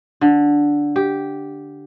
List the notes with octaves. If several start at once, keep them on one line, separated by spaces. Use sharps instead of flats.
D3
G4